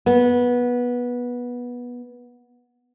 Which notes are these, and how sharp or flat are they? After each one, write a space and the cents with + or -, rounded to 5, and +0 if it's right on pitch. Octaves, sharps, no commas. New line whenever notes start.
B3 -15